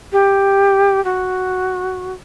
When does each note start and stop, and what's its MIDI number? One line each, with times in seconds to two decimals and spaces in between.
0.12 1.03 67
1.05 2.13 66